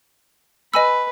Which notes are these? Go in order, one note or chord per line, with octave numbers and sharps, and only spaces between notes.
B4 D#5 G#5 B5 E6